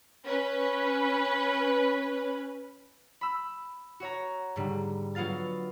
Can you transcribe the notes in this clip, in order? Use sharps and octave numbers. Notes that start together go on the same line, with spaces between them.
C#4 B4
B5 E6
F#4 C#5 A#5
G#2 D3 G3
F#3 B3 F4 F5 A6